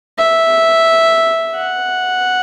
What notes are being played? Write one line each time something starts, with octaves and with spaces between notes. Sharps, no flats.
E5
F#5